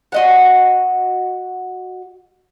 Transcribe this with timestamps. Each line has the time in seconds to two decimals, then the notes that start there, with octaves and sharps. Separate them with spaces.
0.12 F#4 D#5 F#5